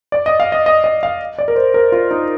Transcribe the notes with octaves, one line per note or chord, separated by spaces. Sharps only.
D5
D#5
F5
D#5
D#5
D#5
F5
D5
A#4
C5
A#4
F4
D#4